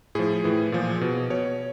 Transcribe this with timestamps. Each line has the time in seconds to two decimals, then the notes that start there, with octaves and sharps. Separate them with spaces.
0.15 A2 F3 G#4
0.44 A2 E3
0.72 A#2 F3
1.01 B2
1.30 B2 C#5